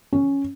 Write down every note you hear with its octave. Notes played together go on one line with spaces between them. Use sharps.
C#4